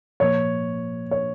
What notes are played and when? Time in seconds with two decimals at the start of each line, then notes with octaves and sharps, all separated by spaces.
0.20 A#2 F3 A#3 C#5
1.11 C#5